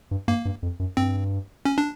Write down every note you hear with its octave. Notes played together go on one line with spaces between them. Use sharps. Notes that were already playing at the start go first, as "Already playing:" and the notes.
G2
G2 A#3
G2
F2
F#2
G2 C4
C#4
D4